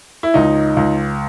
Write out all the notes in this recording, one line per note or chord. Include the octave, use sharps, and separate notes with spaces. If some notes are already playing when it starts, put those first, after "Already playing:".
E4
C#2 D#4
C#2